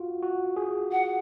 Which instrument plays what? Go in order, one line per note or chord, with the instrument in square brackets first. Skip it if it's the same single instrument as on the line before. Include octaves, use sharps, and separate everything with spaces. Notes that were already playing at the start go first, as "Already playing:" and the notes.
Already playing: [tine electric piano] F4 F#4
F#4
G#4
[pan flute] F#5